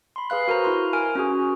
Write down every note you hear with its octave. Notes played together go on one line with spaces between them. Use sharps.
B5 C6
G#4 B4 F5 F#6
F#4 A#4 C5 A#5
E4 C6
A#4 G#5 F6 D7
C#4 F#4 G#4